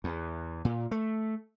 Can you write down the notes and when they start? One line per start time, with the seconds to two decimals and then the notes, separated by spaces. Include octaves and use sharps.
0.04 E2
0.65 A#2
0.91 A3